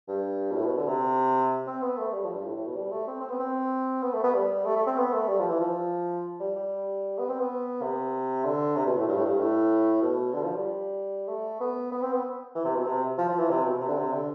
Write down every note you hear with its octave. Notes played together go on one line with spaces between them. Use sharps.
G2
B2
A2
B2
D3
C3
C4
B3
A3
G3
F3
G2
A2
A2
B2
G3
A3
C4
C4
B3
C4
B3
A3
B3
G3
A3
A3
C4
B3
A3
G3
F3
E3
F3
G3
G3
B3
C4
B3
C3
D3
C3
B2
A2
G2
A2
G2
A2
B2
D3
F3
G3
A3
B3
B3
C4
B3
E3
C3
B2
C3
F3
F3
E3
C3
B2
C3
D3
C3
D3